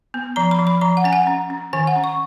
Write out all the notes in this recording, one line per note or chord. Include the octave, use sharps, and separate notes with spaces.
B3
F3 A#5
B5
F3
B5
F3 A#5
F#5
C#4 G#5
F#5
C#4
C#4
D#3 G#5
F#5
C#4
C#6